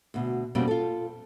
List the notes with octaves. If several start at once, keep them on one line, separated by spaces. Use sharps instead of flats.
D2 B2
F2 B2 G3 A#3 C4 C#4
F4 A4